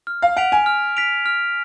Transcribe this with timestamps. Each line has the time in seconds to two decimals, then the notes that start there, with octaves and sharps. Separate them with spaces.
0.07 F6
0.22 F5
0.36 F#5 B6 D7 F7
0.52 G#5
0.66 F6
0.97 B6 D7 F7
1.26 F6